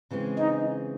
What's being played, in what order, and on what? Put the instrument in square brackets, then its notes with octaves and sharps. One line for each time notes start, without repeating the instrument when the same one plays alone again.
[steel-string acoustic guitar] C#3 E3 G#3 C4
[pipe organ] D#4